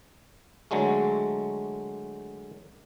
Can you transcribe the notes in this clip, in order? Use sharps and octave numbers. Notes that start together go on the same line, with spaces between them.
D3 F#3 G#3 A3